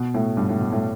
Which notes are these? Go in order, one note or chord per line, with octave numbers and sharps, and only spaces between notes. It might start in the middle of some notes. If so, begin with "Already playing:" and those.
Already playing: B2
A2
G2
A2
B2
A2